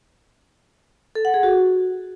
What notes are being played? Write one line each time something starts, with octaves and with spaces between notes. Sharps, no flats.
A4
F#5
G#4
F#4